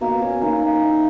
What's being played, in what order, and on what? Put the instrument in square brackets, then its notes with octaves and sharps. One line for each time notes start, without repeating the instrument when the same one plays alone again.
[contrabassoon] B2 [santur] A#3
[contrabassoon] B2 [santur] C#4
[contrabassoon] D#3 [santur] A#3
[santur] A#3
E4